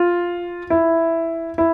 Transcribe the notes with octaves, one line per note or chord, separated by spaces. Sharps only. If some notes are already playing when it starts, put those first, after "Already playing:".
Already playing: F4
E4
E4